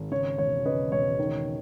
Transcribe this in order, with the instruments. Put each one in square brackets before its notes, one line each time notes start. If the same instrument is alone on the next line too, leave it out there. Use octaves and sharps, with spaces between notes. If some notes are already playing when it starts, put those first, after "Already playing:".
Already playing: [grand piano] G#1
C#3 C#5
E1 C#5
C#3 B4 D#5
E1 C#5
D#3